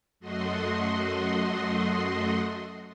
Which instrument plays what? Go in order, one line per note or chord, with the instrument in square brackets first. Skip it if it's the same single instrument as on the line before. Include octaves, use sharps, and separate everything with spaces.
[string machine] F#2 A3 F#4 D#5 C6